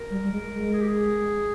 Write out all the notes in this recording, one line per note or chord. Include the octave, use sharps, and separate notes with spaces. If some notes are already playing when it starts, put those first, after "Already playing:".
Already playing: A#4
G3
G3
G#3
G#3
G#4
G4
G#4